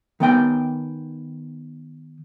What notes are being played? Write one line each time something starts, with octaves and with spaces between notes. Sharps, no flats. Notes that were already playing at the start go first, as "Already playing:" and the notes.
D#3 B3 G5 G#5